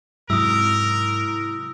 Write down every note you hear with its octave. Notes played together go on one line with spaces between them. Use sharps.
G#2 C3 F#3 E4 A#4 D#6 E6